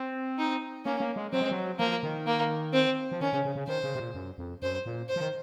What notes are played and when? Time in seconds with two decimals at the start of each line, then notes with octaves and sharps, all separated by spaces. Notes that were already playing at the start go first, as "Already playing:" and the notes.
Already playing: C4
0.38 D#4
0.85 A#3 C#4
1.00 A#3
1.16 G#3
1.33 F#3 C4
1.41 G#3
1.51 F#3
1.79 F3 A#3
2.03 D#3
2.27 A#3
2.74 C4
3.12 F3
3.21 D#3 C#4
3.33 C#3
3.45 C#3
3.56 C#3
3.67 D#3 C5
3.84 C#3
3.95 C3
4.00 A#2
4.14 F#2
4.38 F2
4.62 F#2 C5
4.86 A#2
5.09 C5
5.16 F3
5.21 D#3